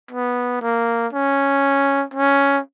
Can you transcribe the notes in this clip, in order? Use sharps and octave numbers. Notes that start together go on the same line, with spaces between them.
B3
A#3
C#4
C#4